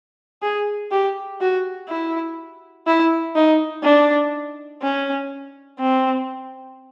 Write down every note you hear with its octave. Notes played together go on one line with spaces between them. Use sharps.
G#4
G4
F#4
E4
E4
D#4
D4
C#4
C4